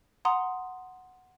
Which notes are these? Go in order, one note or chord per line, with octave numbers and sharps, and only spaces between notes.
F#5 A#5 C6 D#6